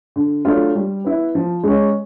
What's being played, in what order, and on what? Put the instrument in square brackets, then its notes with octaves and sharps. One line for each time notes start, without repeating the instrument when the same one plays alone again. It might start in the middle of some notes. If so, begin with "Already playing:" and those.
[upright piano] D3
F#3 A3 D4 F4
G3
B3 E4
F3
G#3 C#4